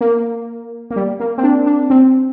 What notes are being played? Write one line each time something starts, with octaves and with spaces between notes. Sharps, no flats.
A#3
A#3
G3
A#3
C4
D4
D4
C4